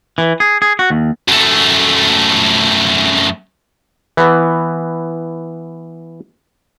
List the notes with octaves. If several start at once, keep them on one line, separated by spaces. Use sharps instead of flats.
E3
G#4
G#4
F#4
D#2
F#2 A3
E3 B3